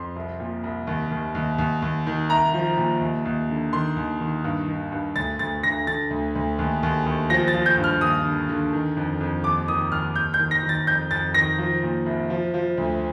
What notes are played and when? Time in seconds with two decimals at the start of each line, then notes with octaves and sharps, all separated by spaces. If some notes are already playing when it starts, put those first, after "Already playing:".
Already playing: F2 C6
0.16 C2
0.40 A#2
0.64 C2
0.87 D#2
1.11 D#2
1.35 D#2
1.58 D#2
1.82 D#2
2.07 D#3
2.30 C2 A#5
2.54 F3
2.77 A#2
3.01 D#2
3.25 D#2
3.49 D3
3.73 D#3 C6
3.96 D#2
4.21 D#3
4.44 G2
4.68 D#3
4.92 G2
5.16 D2 A6
5.39 D2 A6
5.63 D3 A#6
5.87 D3 A6
6.10 D2
6.35 D2
6.59 D#2
6.83 D#2
7.06 D#2
7.30 F3 A#6
7.48 A6
7.54 F3
7.66 G6
7.77 G2
7.84 F6
8.01 D#2 D#6
8.25 D3
8.49 D3
8.73 D#3
8.97 F2
9.21 F2
9.44 D#2 D6
9.68 D#3 D#6
9.92 D#2 F6
10.15 D#2 G6
10.34 G6
10.39 D#3
10.51 A#6
10.63 D#3
10.69 A6
10.87 F2 G6
11.11 F2 A6
11.34 D#3 A#6
11.58 F3
11.83 A#2
12.06 C2
12.30 F3
12.54 F3
12.77 D2